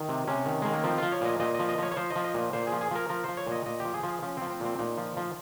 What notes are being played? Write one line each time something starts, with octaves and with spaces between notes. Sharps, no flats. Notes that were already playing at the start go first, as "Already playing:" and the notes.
Already playing: D#3 D#4
C3
C3 C#4
D#3
D#3 G#3
A#3
F3 C4
F3 F4
C#5
A#2 D#5
A#2 D#5
F3 D#5
D#5
F3 C#5
C#5
F3 C5
D#5
F3
D#5
A#2
A#2 C5
G#4
F3
G#4
F3 A#4
F3 A#4
F3 C5
C#5
A#2
D#5
A#2 D#5
G4
F3
G#4
F3
G#4
F3 C#4
C4
F3
C4
A#2 C4
A#2 D#4
F3
F3